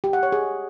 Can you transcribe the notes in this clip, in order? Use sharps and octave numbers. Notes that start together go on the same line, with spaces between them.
G4
F#5
C#5
G#4